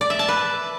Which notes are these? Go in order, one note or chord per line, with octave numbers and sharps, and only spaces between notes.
D5
E5
A5
B4